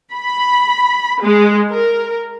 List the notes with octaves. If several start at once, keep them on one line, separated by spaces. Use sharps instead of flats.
B5
G#3
A#4